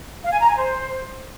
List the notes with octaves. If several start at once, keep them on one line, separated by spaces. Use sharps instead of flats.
F5
G#5
A#5
G#5
C5